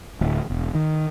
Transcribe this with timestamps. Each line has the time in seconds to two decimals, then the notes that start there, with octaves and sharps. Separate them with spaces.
0.21 D1
0.50 E1
0.75 D#3